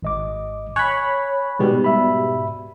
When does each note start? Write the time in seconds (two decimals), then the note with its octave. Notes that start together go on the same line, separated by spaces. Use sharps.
0.02 G#1 D#5 D6
0.76 C#5 G#5 B5 F#6
1.59 G#2 B2 G3
1.84 E5 B5